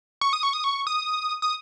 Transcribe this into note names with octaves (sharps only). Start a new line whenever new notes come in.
C#6
D#6
C#6
D#6
C#6
D#6
D#6